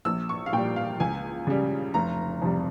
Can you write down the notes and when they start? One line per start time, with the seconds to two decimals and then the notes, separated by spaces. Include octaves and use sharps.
0.05 A#1 E6
0.29 C#6
0.46 F5
0.52 A#2 G3 G5
0.76 F5
1.00 C#2 G#5
1.47 C#3 G3
1.94 F1 A#5
2.42 F2 C3 G3